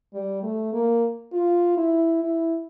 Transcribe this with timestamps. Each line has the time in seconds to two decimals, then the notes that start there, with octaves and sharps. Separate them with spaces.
0.13 G3
0.43 A3
0.73 A#3
1.33 F4
1.77 E4
2.23 E4